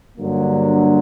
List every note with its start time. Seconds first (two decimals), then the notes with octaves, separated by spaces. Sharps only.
0.18 G2 D3 F#3 A#3